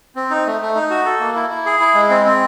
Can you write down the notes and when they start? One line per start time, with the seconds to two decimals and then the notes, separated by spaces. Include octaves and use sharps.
0.16 C4
0.31 D#4
0.46 A3
0.61 A3
0.75 D#4
0.90 F#4
1.05 A4
1.20 A#3
1.35 E4
1.50 E4
1.66 G#4
1.80 E4
1.95 G#3
2.10 C4
2.26 C4